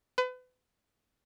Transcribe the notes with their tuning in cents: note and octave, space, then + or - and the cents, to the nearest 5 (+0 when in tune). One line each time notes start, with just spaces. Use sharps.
B4 +35